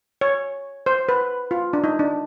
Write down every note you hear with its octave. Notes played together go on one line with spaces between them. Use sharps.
C#5
C5
B4
F4
D4
D#4
D4